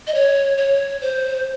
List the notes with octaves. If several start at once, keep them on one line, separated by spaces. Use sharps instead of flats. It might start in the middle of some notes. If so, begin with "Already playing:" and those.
D#5
C#5
C#5
C5